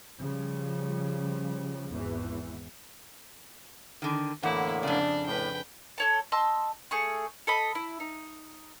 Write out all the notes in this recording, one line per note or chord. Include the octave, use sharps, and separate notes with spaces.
C#3 F3 G3
G#1 E2 E3
D3 D#3
E2 A2 D3 A#3 E4 F#5
F2 C#3 D4 D5
A2 B4 G5
A4 C#5 A5
D#5 A5 C6 E6
A3 G#4 C#6
A4 D#5 B5
E4
D#4